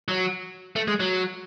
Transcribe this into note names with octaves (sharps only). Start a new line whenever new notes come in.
F#3
A3
G#3
F#3